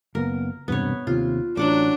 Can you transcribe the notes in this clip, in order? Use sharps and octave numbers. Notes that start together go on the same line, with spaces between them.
F#1 A#3 B3 A#4
E1 G2 C3 B3 C#5
D#2 C3 F4
A1 F#3 D4 F#5 D6